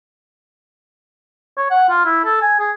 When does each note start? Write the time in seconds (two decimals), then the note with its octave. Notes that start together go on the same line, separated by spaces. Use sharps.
1.57 C#5
1.71 F#5
1.90 F4
2.05 E4
2.25 A4
2.42 G#5
2.60 G#4